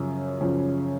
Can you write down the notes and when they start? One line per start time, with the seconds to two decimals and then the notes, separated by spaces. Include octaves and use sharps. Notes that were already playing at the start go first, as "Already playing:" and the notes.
Already playing: F#2 C#3 F3
0.41 F#2 C#3 F3